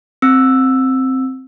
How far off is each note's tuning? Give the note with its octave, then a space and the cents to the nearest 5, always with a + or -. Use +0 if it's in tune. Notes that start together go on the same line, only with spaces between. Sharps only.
C4 +0 E6 +0